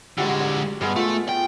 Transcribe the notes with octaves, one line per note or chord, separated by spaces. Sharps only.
D3 G3 G#3 F#4 D#5
D5
G2 G#3 B3 D#6
A3 F4
G5